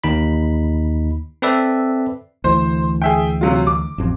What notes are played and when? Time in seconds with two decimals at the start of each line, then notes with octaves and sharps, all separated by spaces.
0.04 D#2 D#4 B5
1.42 C4 A4 B4 D5 E5
2.44 D2 E3 C5
3.02 G#4 E5 G5
3.41 C3 F#3 F4
3.67 D6
3.98 A1 F2